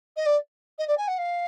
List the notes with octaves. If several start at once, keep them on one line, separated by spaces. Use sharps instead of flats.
D#5
D5
D#5
D5
G#5
F#5
F5